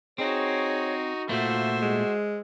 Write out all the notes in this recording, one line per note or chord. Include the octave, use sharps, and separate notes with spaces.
C4 D#4 F#4 G#4 C#5
A#2 A3 F4 F#4 C5 E5
G#3